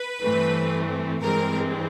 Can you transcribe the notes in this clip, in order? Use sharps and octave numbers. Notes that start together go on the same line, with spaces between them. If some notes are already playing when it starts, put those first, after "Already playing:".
Already playing: B4
G2 E3 A3 C4
G2 E3 G#3 C4 A#4